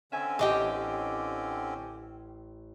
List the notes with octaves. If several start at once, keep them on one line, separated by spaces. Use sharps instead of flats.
D3 C4 C#4 E5 G#5
A1 G4 D#5 D6